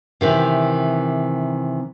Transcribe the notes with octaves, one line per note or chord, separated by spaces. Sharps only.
C3 D#3 E3